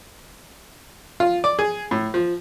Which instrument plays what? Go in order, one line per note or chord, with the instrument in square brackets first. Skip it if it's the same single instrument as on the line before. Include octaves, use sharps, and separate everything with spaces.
[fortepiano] F4
D5
G#4
A2
F3